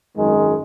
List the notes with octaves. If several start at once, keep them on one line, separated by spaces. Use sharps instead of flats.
G#1 F#2 D#3 G#3